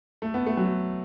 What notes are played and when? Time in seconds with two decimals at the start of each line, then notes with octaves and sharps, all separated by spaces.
0.22 A3
0.34 B3
0.46 A3
0.57 F#3